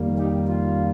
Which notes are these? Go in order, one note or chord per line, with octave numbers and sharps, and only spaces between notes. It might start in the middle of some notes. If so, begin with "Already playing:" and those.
Already playing: F2 D#3 G3 A#3
D#4 G4
F4